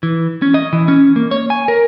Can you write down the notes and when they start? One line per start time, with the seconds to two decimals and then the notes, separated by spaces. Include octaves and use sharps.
0.03 E3
0.42 C#4
0.54 D#5
0.73 E3
0.88 C#4
1.16 A#3
1.31 C#5
1.50 G#5
1.68 A#4